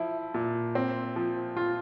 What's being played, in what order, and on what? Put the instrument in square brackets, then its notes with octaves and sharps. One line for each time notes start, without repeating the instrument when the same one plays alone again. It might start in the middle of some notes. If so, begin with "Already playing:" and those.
Already playing: [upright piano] F3 E4
A#2
C4
F3
F4